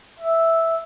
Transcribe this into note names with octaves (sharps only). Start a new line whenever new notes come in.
E5